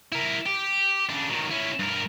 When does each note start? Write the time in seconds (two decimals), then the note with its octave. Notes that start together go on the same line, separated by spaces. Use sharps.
0.12 E4 A#4
0.46 G4
1.10 C#3 D4
1.31 D#3 F#3
1.51 C#4 E4
1.79 G2 A#4